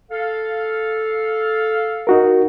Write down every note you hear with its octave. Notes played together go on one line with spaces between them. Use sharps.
A4 F5
D#4 F#4 A#4